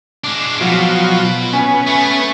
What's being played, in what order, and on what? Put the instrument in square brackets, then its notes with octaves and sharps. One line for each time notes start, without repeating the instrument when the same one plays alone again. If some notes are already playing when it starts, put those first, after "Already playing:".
[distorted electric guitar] G#3 D4
[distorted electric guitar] B2 [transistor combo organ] F3 F#3
[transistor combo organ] B3 C#4 [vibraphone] G#5
[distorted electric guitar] A3